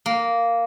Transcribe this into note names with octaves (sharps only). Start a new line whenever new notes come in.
A#3